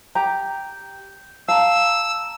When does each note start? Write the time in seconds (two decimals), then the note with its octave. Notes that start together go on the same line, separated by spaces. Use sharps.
0.15 G4 A#5 G6
1.48 F5 A5 A#5 E6